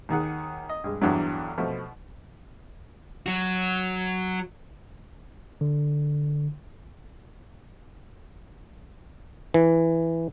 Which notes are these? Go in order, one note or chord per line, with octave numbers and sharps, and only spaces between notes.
D#2 D#3 G#4 F#5
D#5
G2 G#3
E2 G2 D3 E3 F#3
B2 F3 A3
F#3 F#4
D3
E3